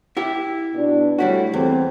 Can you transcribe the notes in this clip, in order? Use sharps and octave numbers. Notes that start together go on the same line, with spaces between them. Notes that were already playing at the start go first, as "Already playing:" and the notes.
E4 G4 E5
B2 D4
G3 A3 E4 F#4 C#5
E2 C4